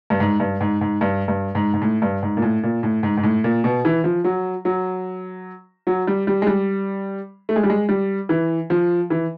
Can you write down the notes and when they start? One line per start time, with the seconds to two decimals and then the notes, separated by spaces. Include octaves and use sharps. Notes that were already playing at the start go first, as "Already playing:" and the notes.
0.10 G2
0.20 G#2
0.40 G2
0.61 G#2
0.81 G#2
1.01 G2
1.28 G2
1.55 G#2
1.74 G#2
1.82 A2
2.02 G2
2.23 G#2
2.37 A#2
2.42 A2
2.63 A#2
2.83 A2
3.03 G#2
3.17 G#2
3.23 A2
3.44 A#2
3.64 B2
3.85 E3
4.04 F3
4.24 F#3
4.65 F#3
5.87 F#3
6.07 G3
6.27 G3
6.42 G#3
6.47 G3
7.49 A3
7.56 G#3
7.63 G3
7.70 G#3
7.89 G3
8.29 E3
8.70 F3
9.10 E3